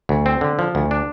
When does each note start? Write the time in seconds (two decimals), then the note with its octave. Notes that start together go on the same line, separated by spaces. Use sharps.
0.09 D2
0.26 C4
0.41 D3
0.59 F3
0.75 D2
0.91 D4